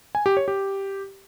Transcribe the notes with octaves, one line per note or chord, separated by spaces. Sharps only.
G#5
G4
C#5
G4